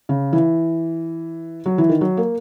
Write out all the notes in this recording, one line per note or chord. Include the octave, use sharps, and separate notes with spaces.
C#3
E3
F#3
E3
D#3
F#3
A#3